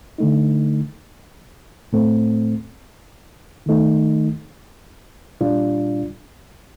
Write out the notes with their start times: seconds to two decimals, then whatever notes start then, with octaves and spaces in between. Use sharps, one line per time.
0.18 D3 A3 D#4
1.93 A2 A3 C4
3.66 D#3 A3 D#4
5.41 A#2 G3 D4 F4